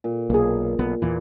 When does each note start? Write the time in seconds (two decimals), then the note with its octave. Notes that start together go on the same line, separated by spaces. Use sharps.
0.04 A#2
0.30 B1 A#3 G#4
0.79 B1 B3
1.02 E2 A#2 E3